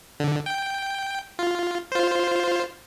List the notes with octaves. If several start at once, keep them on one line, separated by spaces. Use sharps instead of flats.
D3
G5
F4
F4 C5